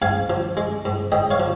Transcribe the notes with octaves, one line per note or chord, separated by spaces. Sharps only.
G#2 F5 G#5
F3
G#3
G#2
G#2 D#5 G5
C#5 F5
F3